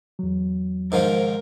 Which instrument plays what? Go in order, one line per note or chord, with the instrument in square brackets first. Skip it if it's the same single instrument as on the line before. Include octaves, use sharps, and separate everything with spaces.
[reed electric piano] E2 F#3
[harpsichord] G#2 D#3 F3 [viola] A#4